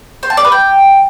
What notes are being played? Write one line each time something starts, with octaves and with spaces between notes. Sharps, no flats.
C5
A5
D5
B4
G5